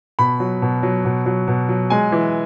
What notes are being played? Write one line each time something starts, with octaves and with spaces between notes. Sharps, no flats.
B2 B5
F#3
B2
F#3
B2
F#3
B2
F#3
G#3 G#5
E3